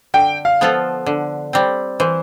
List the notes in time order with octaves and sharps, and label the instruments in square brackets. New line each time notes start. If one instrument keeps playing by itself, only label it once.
[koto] D3 [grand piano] G5
[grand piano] F5
[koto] F3 B3 F4 A4
D3
G3 C4
[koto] E3 [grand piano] C5